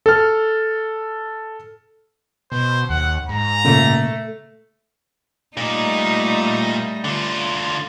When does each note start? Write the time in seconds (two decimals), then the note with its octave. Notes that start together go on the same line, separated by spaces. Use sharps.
0.06 A4 F6
2.52 B2 C5
2.90 D#2 F#5
3.29 G#2 A#5
3.65 A#2 C#3 A3 A#3
5.57 A#2 G3 A3 D#4
7.04 D3 F4